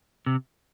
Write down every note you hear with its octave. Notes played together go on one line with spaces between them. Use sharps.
C3